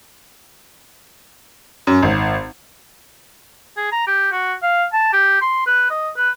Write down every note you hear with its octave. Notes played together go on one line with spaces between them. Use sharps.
F#2
G#1
G#4
A#5
G4
F#4
F5
A5
G4
C6
B4
D#5
B4